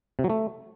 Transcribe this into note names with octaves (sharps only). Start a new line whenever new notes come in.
C3
F#3
A3